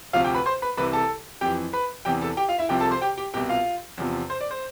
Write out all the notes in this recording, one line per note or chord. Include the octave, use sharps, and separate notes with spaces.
D2 C3 F3 F4 F5
G4 G5
B4 B5
C5 C6
B4 B5
C2 C3 E3 B4 B5
A4 A5
F2 E3 G4 G5
B4 B5
E2 C3 E3 G4 G5
A4 A5
G4 G5
F4 F5
E4 E5
C2 C3 F3 G4 G5
A4 A5
C5 C6
G4 G5
G4 G5
C2 B2 G4 G5
F4 F5
E2 C3 F3
C5
D5
C5